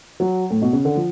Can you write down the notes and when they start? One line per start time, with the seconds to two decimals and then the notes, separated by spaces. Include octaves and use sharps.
0.20 F#3
0.50 A2
0.62 B2
0.73 C#3
0.85 D3
0.95 F3